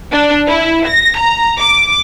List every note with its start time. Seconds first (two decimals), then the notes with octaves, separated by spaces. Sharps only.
0.12 D4
0.48 E4
0.88 A#6
1.19 A#5
1.59 D6